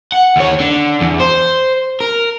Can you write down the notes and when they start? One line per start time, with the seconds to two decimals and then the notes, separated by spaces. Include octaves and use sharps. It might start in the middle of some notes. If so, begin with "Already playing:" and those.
0.12 F#5
0.36 D#2 C#5
0.60 D3
1.02 E2
1.20 C5
2.01 A#4